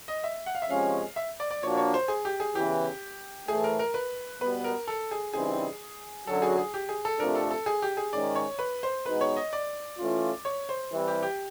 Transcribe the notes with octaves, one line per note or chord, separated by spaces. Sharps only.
D#5
E5
F#5
F5
E5
C3 F3 G#3 C#4 F5
E5
D5
D5
A#2 F3 A#3 D4 F#4 C#5
C#5
C5
G#4
G4
G#4
E2 C#3 E3 G4
A2 E3 A3 G#4
A#4
A#4
B4
B2 G3 B3 B4
A#4
A4
G#4
C#3 E3 G3 C4 D#4 G#4
F#2 D3 F#3 A4
G#4
G#4
G4
G#4
A4
F2 C3 F3 A3 D4 A#4
A4
A4
G#4
G4
G#4
G#2 D#3 G#3 C#4 D5
C#5
B4
C5
B2 G#3 B3 D#4 B4
C#5
D#5
D5
E3 A3 C#4 F4
C#5
C5
E3 G3 C4 E4
G4
G4